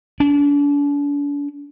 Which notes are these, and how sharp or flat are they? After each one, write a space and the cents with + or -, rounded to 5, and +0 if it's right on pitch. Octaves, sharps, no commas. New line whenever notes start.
D4 -40